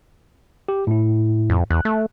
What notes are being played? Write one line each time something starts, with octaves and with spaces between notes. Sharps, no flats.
G4
A2 E4
F2
E2 F#6
A3